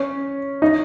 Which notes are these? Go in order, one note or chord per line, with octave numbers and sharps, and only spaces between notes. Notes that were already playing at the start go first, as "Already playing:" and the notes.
Already playing: C#4
D#4